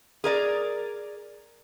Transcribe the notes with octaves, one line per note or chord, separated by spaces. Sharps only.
G#4 A#4 D5